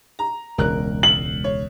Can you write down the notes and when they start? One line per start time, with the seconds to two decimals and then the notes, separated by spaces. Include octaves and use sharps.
0.19 A#5
0.58 E1 C#2 A#4 F#6
1.03 F#7
1.44 C#5